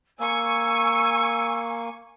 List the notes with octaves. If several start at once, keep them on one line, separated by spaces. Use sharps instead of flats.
A#3 G#5 C#6 E6